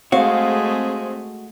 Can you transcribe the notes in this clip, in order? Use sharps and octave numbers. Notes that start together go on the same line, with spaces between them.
G#3 A3 C4 F#4 G#4 F5